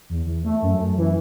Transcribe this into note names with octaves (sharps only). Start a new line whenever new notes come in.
E2
E2
A3
F#2
F#2
E3